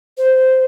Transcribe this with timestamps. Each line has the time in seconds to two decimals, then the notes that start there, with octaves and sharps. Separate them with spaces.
0.18 C5